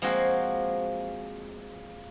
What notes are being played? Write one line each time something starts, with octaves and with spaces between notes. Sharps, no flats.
F3 G#3 A#3 C4 F#4